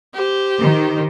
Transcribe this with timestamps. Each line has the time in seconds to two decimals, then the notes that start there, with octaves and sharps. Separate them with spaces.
0.14 G4 C5
0.61 D#3